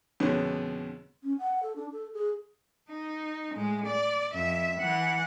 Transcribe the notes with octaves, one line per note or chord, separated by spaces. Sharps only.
F2 B2 D3 G#3 B3 C#4
C#4
F#5
A4
D4
A4
G#4
D#4
A2 G#3
D5
F2 E5
E3 F#5